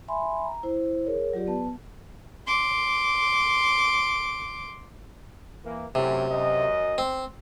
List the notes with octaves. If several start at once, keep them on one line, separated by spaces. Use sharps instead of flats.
E5 G#5 B5 C6
A#5
E4 C5
G#4 A#4 C#5
F#3 F4 G4 D5
B3 B4 A5
C6 D6
E3 A#3
F#2 A2 C3
F#2 D#5
C4